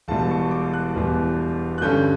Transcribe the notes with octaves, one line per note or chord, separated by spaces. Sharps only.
E1 E2 B2 G3 A5
C#6
D6
F#6
E1 E2 B2 G3
F#6
G2 D3 G3 C#4 G6